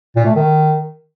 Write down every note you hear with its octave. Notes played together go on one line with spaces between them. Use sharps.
A#2
A3
D#3